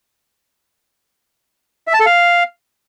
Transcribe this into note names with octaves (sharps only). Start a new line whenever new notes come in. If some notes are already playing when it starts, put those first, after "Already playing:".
E5
A5
A4
F5